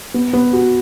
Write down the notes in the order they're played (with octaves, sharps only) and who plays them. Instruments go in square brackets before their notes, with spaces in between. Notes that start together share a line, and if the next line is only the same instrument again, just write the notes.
[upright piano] B3
B3
F#4